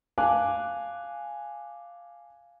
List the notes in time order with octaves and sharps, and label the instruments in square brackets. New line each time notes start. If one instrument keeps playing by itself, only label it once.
[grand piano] F5 G#5 A5 D6 F#6